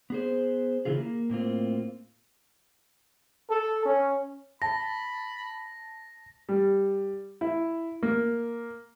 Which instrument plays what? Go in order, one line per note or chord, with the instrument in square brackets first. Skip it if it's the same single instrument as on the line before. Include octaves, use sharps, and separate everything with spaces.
[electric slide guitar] B3 G#4 C5
C#3 E3 F4 G#4
A#3
A2 A#3 C4 F4
[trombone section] A4
C#4
[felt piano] A5 [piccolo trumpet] B5 [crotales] A#6
[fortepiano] G3
E4
A#3